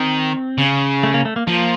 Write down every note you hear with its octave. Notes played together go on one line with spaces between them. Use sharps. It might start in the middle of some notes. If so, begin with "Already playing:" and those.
Already playing: D#3 C4
C#3
A3
A#3
A3
A#3
F3 A#3